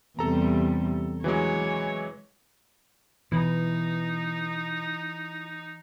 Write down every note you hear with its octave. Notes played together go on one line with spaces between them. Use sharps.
E2 C3 G3 A4 A#5
E3 F#3 G#3 C#5
B2 E3 D#4 E4